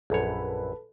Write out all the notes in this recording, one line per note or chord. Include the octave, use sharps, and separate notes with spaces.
A#1 F#2 A4 B4 C#5